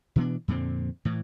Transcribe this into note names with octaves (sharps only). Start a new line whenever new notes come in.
B2 E3 B3 D4
F2 A#2 D3 C4
A2 E3